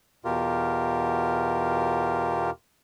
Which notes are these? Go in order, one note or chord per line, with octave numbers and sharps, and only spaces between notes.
E2 B2 F4 G4 A#4